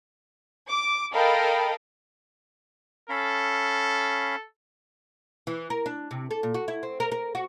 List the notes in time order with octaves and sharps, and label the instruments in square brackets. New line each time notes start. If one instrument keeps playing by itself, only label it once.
[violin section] D6
A4 A#4 D#5 F5 G5 B5
[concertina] C#4 F5 B5 [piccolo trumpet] A4
[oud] E3
A#4
D4
C3
A4
A#2
F#4
E4
C4
A#4
A#4
F#4